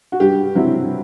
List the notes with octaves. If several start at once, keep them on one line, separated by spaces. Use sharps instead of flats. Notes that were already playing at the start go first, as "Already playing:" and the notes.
F#4
G2 G4
F#3 C4 E4